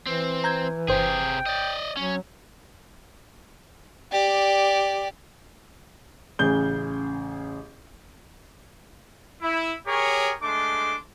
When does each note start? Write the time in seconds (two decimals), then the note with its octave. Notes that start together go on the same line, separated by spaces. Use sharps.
0.06 E3 C4
0.44 A#5 G6 G#6
0.88 G1 C3 G#4 C5 G5
1.46 D5 D#5
1.97 F#3 C#4
4.11 G4 D5
6.39 A1 C#3 G#4 G6 G7
9.42 E4
9.87 G4 G#4 A#4 C#5
10.43 G#3 A3 D4 C6 D6